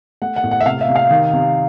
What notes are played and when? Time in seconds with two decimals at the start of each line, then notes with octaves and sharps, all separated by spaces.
0.22 A3 F#5
0.36 F#5
0.44 A2
0.51 F#5
0.61 E5
0.66 C3 F5
0.81 E5
0.88 C3
0.96 F5
1.11 D#3
1.33 C3